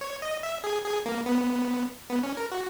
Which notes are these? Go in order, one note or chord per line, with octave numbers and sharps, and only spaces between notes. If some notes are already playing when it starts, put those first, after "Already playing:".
C#5
D#5
E5
G#4
G#4
A#3
B3
B3
C#4
A#4
F#4